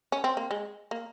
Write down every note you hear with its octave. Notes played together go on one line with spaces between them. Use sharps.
C#4
C4
A#3
G#3
A#3